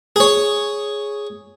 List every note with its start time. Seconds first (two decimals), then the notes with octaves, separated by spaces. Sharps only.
0.16 G#4 C#5